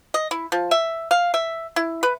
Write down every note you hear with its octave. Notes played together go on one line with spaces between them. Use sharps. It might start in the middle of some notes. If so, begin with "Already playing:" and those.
D#5
E4
F3
E5
F5
E5
E4
B4